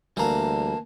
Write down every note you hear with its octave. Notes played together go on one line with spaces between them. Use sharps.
D2 E3 G3 A#3 A5 A#5